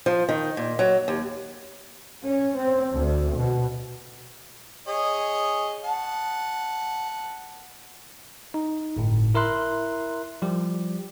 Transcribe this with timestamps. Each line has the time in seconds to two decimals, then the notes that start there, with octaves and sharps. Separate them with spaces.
0.06 F3
0.29 D#3
0.57 A#2
0.79 F#3
1.08 D#2
2.25 C#4
2.57 C4
2.93 D2
3.34 B2
4.87 G#4 C#5 D#5
5.84 F#5 A5
8.54 D#4
8.96 G1 A2
9.35 E4 A#4 E5 C6 F#6
10.42 F3 G3 G4